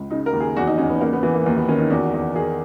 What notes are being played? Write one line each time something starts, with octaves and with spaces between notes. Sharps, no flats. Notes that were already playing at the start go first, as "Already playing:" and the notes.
Already playing: C#2
C#3 D#4
A#4
D#2
G#4
E2 F#4
D#4
E2 C#4
B3
C#3 A#3
B3
E3 B3
A#3
D#2 A#3
B3
D#3 C#4
D#4
E2 F#4
E2
D#3 G#4